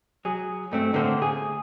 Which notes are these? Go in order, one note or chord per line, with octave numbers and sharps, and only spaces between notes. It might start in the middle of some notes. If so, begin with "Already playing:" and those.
F#3 G#4
G2 A3 C4
A2 D3 A3 A#3 C5
G#4